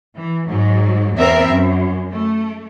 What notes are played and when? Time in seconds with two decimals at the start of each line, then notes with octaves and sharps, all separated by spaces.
0.17 E3
0.48 G#2 F#3
1.16 E2 B3 C4 A#4 E5
1.48 F#2
2.12 A3